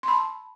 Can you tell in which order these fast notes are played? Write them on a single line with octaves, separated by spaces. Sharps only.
C6 B5 A5